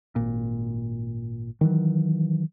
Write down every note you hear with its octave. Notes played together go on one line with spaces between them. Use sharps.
G#1 A#2
D#3 E3 F#3